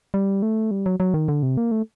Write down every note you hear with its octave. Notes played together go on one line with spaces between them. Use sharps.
G3
A3
G3
F#3
F#3
D#3
D3
C3
A#3
A3